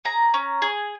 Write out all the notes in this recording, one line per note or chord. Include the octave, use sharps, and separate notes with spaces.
G#4 A#5
C#4
G#4